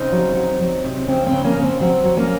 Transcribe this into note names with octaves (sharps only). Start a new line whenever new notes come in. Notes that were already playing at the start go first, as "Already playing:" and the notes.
Already playing: C#3 C4 D#4
F#3
F#3
F#3
C3
C#3 C4
C4
C#3
A#3 C#4
C#3
C4
F#3 C4
F#3
A#3 C#4